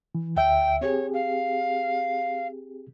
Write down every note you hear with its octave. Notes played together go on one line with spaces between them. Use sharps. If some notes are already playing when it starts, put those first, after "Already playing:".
E3
D2 E5 G5
C4 G4 G#4 C#5
F5